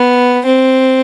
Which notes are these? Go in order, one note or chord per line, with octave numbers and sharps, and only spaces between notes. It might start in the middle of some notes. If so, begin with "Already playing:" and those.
Already playing: B3
C4